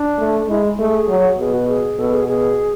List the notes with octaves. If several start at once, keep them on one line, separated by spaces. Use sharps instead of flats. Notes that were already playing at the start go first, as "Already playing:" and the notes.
Already playing: D4
A3
G#3 E4
A3 G#4
F#3
B2 G#4
F#4
G#4
B2 A4
G#4
B2 G#4